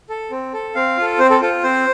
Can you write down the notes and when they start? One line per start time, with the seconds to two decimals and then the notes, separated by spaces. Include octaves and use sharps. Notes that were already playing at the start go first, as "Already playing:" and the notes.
0.09 A4
0.31 C4
0.53 A4
0.75 C4 F5
0.97 F4 A4
1.19 C4 C5
1.30 A4
1.41 F4 A4
1.63 C4 C5